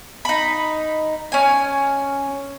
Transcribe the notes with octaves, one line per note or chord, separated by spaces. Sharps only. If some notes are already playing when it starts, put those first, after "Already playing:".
D#4 B5
C#4 G#5